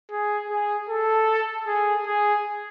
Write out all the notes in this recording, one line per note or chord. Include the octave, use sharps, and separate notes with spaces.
G#4
G#4
A4
G#4
G#4